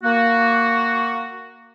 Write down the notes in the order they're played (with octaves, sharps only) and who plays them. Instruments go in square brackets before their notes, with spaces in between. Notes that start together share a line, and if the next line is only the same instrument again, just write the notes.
[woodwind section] A#3 F#4